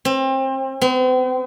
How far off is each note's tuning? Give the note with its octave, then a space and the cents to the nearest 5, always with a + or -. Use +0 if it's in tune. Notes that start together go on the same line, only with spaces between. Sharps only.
C4 +30
C4 -45